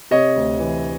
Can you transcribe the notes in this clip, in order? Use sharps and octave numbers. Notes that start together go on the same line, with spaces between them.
C3 C#5 D#5
D2
E3